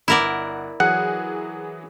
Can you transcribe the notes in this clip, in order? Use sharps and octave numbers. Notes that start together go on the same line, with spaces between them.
G1 E4 A#4 D5 F#5
E3 F#3 G#4 F#5